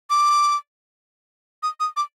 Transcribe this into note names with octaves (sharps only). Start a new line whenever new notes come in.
D6
D#6
D#6
D6